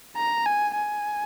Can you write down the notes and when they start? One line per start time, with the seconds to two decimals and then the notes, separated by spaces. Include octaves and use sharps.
0.16 A#5
0.46 G#5
0.75 G#5